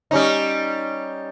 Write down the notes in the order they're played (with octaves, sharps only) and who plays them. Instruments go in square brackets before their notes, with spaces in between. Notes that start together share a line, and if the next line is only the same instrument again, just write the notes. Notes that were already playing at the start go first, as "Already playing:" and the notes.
[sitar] G3 C#4 D#4